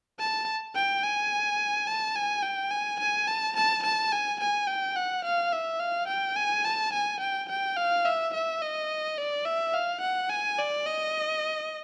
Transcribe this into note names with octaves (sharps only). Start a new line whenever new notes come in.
A5
G5
G#5
A5
G#5
G5
G#5
G#5
A5
A5
A5
G#5
G#5
G5
F#5
F5
E5
F5
G5
G#5
A5
G#5
G5
G5
F5
E5
E5
D#5
D5
E5
F5
F#5
G#5
D5
D#5